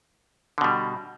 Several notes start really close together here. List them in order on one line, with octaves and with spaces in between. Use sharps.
D3 B2 G3